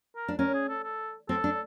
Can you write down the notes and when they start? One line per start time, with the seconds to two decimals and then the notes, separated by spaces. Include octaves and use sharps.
0.16 A#4
0.28 D4
0.39 C#4 A#4
0.54 G#4
0.68 A4
0.83 A4
1.29 C4 A4
1.44 D4